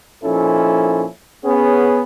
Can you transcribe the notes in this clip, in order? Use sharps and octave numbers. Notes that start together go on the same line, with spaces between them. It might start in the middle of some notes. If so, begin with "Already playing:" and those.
A#2 F3 C#4 D#4 E4 A4
B3 C#4 G#4